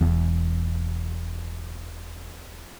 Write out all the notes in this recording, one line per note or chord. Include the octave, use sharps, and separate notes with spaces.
E1 E2